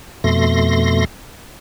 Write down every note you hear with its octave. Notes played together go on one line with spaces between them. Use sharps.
F2 B2 A3 C6 A#6